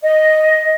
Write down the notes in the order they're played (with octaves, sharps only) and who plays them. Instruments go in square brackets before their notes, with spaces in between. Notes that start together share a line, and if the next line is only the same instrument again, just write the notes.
[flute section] D#5